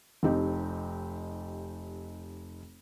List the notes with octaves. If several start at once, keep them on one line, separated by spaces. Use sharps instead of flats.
F1 C4 D#4 G4